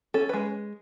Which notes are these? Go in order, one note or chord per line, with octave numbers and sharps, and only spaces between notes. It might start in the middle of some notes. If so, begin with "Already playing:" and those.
C#4 A4
G#3 B4